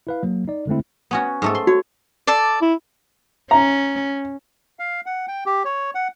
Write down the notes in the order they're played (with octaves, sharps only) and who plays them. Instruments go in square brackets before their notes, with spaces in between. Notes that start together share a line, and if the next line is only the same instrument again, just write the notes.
[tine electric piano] E4 B4 F5
F#3 A#3
D#4 D5
D3 G#3 A3 C4 E4
[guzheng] B3 C#4 F#4
G#2 A3 A4
C6
[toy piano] F#4 [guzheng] C#5
[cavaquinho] A4 D5
[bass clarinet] E4
[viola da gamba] C#4 [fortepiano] A#5
[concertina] F5
F#5
G5
G4
C#5
F#5